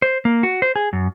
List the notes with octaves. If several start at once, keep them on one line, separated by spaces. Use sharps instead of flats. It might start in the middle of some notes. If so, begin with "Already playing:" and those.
C5
A#3
F#4
C5
G#4
F#2